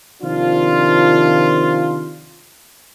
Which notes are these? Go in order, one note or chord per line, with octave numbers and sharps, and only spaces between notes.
C3 D#3 F3 D4 F4